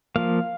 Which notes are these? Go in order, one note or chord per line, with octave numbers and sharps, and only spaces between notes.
F3 A#3 F5